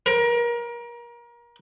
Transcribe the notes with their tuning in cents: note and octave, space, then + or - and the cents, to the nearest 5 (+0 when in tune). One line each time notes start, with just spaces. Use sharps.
A#4 +30